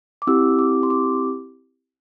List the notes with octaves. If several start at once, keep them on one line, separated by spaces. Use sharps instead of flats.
D6
C4 E4 G4 E6
D6
C6
D6